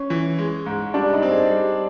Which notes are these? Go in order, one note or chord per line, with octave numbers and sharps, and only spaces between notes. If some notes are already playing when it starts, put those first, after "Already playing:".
Already playing: C#4
E3
G#3
G#2
G3 D4
D#4
C4
G#4
G3